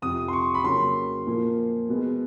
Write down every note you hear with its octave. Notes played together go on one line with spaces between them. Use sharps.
F2 C3 F3 D#6
C6
C#6
B5
C#3 F#3 A#3 C#4 C6
A#2 F3 A#3
B2 G#3 B3